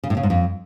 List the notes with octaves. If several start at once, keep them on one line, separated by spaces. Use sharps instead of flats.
C#3
A2
C#3
G#2
F2